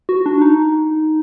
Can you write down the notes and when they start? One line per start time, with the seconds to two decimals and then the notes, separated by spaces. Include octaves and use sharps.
0.09 F#4
0.26 D4
0.42 D#4